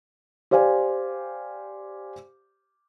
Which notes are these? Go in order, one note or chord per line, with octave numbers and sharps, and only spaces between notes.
G4 C5 D5 F5 G#5